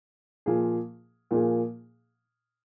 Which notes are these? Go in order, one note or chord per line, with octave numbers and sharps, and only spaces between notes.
A#2 F3 A#3 G#4
A#2 F3 A#3 G#4